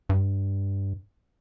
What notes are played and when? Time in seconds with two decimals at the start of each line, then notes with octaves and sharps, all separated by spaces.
0.09 G2